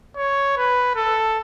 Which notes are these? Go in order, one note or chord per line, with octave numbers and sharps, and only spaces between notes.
C#5
B4
A4